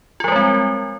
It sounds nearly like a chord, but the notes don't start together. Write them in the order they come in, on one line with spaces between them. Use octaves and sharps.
F4 F3 G3 G#3 C4